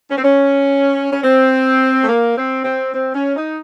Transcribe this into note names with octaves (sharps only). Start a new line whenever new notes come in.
C#4
C4
C#4
C#4
C4
A3
A#3
C4
C4
C4
C#4
D#4